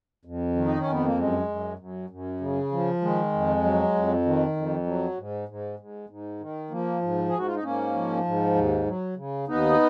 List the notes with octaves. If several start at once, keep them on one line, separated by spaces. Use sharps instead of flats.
F2
D#3
D#4
C#4
F2
B3
A#3
F#2 G#3
F#2
F#2
F#2
C#3
F3
D#3 G#3
F2
F#3
F2
D#3
F2
F#3
G#2
G#2
G#2
G#2
D#3
F3 A#3
G#2
G#2 G#4
F#4
F4
D#4
G#2 A#3 C#4
F3
G#2
D#2
F#3
C#3
D#2 B3 D#4